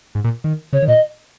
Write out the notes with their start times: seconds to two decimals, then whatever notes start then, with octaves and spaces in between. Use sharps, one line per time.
0.15 G#2
0.24 A#2
0.44 D#3
0.73 C#3 C#5
0.82 D#3
0.87 A#2 D#5